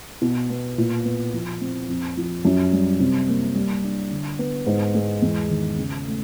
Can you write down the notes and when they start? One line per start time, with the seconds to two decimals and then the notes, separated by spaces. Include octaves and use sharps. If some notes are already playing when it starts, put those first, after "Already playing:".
0.22 B2
0.50 B3
0.78 A#2
1.05 B3
1.33 F3
1.61 C4
1.88 F2
2.17 F3
2.45 F#2
2.73 G3
3.00 C3
3.28 A#3
3.55 G3
3.84 D4
4.11 D3
4.39 B3
4.67 G#2
4.95 G#3
5.22 E2
5.50 D#3
5.78 C#3
6.05 A3